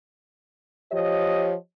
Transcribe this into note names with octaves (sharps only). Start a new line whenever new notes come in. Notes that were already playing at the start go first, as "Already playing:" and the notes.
F3 G4 C#5 D#5